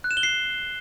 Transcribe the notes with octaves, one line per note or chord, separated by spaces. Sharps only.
F#6
E7
G7
C7